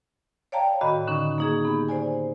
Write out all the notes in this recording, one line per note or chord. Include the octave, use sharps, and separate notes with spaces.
C#5 D5 F5 G5 A5 A#5
A2 D#3 F#4 D#5 A#5 B5
D3 D#3 C#4 D#4
A#3 D#4 G#4
B3 G4
C5 D5 G#5